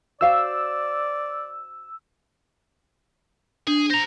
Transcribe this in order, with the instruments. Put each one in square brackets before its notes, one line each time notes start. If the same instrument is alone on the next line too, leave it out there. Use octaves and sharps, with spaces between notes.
[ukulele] F#4 C5 F5 [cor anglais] D5 [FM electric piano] E6
[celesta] D4 [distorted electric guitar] G#4
[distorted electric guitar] C5 A#5 [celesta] A#6 F7